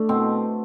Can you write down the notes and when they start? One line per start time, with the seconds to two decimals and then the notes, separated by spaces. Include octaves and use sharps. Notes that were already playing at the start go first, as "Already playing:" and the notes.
Already playing: A3 D4
0.09 B2 C4